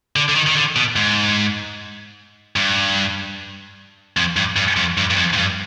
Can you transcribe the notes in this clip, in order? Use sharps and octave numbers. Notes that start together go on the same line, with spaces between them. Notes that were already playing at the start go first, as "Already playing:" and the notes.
D3
D3
D#3
D#3
D3
B2
G#2
G2
F2
G2
G2
F2
G2
G2
F2
G#2
G2